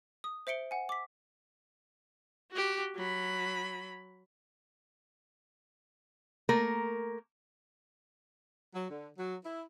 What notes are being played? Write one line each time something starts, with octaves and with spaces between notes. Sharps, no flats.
D#6
C5 E5 C#7 D7 G7
F#5 G#5
D6 B6
F#4 G4
F#3 B5
A3 A#3 A#4
F#3
D3
F#3
E4